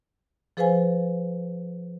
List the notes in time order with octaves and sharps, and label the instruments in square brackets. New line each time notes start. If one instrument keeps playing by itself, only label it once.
[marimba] F3 G#4 B4 C5 F5 G#5